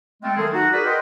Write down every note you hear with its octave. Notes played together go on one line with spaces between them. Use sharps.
G#3 A3 C4 F4 A4 G5
D#3 F#3 A3 C4 G#4 A4
D#4 F#4
F#4 G#4 A#4 B4 D5
A#4 B4 D#5 F#5 G5 C6